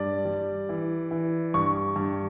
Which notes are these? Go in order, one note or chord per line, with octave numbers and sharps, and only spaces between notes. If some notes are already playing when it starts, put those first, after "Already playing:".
Already playing: G2 D5
G3
E3
E3
G2 C#6
G2